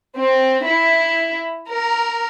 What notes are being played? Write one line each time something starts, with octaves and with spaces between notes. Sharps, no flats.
C4
E4
A#4